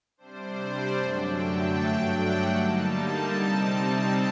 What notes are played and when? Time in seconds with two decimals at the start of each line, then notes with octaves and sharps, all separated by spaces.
0.18 C3 G3 D4 C5
0.58 D5
0.96 F#2 D3 F#3 A3 D4 G5
1.36 A5
1.76 G2 F#3 A3 D4 G5
2.15 F#5
2.54 D3 G3 A#3 D#4 A5
2.94 A5
3.34 C3 G3 C4 D#4